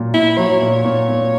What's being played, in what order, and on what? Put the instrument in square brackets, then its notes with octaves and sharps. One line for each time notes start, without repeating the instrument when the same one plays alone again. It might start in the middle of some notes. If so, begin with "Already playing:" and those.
Already playing: [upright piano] A#2 F#3
[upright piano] A#2 [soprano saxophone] E4
[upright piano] F#3 [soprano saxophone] C#5
[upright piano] A#2
A#2
A#2